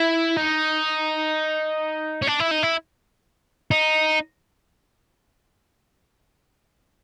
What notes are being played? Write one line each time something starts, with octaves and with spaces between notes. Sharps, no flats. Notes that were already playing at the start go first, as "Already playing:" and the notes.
Already playing: E4
D#4
C#4
D4
E4
D#4
E4
D#4